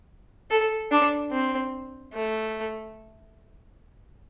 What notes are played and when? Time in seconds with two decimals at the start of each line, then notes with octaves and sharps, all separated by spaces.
0.51 A4
0.91 D4
1.32 C4
2.13 A3